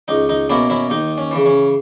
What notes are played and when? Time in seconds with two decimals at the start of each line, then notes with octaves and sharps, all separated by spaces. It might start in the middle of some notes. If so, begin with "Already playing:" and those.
0.08 C#2 D#4
0.29 D#4
0.50 B2 A#3 C#4 E4
0.70 C#4 E4
0.90 D#2 D#4
1.18 C#4
1.31 C#3 E3
1.46 C#4